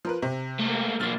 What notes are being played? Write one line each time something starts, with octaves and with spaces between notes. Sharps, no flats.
F3 A#4 B4
C3
A3 A#3
B1 A#3 F6 A6